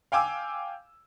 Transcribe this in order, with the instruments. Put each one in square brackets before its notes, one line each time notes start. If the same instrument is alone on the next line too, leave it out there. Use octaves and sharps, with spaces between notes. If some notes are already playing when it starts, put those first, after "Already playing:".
[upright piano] F5 G5 G#5 D6 E6